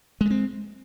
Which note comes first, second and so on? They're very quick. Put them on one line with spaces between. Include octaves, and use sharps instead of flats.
G#3 A3 C4